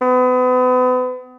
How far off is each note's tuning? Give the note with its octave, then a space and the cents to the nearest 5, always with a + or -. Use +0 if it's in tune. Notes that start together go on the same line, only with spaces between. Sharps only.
B3 +35